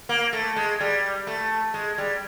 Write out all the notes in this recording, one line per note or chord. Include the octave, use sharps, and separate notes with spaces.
A#3
A3
G#3
G3
A3
G#3
G3